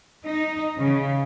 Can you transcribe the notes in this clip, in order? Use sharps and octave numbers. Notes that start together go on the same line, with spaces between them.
D#4
C#3